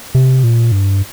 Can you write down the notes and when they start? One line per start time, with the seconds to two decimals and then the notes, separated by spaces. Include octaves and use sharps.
0.15 C3
0.43 A#2
0.72 G2